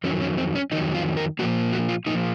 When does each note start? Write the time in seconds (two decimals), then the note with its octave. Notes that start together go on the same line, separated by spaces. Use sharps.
0.04 F2 D#3 F#3 C#4
0.22 C#4
0.38 C4
0.55 C#4
0.71 F2 D#3 F#3 D#4
0.94 F4
1.17 A#4
1.39 A#2 F3 A#3 F#4
1.72 F#4
1.89 F4
2.06 A#2 F3 A#3 D#4